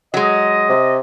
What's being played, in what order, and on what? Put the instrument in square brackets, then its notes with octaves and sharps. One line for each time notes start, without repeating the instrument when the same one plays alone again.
[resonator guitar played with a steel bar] F#3 G#3 [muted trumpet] D#5
[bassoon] C3